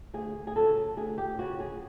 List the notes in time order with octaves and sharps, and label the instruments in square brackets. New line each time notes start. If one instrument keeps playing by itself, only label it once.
[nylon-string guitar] D2 G#4
G#4
C#3 F#3 A4
D2 G#4
G4
C#3 F#3 F#4
G#4